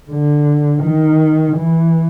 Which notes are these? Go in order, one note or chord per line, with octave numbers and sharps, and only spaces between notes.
D3
D#3
E3